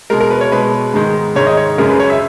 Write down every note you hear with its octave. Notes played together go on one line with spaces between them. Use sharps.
B2 G#3 A#4
A#4
B4
C#5
B2 G#3 B4
G#2 D#3 G#3
G#2 D#3 G#3 C#5
D#5
C#5
F#2 C#3 G#3 A#4
B4
C#5
E5